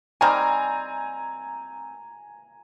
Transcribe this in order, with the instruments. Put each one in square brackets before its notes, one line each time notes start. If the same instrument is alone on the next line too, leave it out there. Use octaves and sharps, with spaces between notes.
[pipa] D#3 G3 C4 [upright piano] G#5 A#5